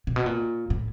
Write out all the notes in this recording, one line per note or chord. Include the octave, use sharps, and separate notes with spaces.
A#2
B2
A#2
A2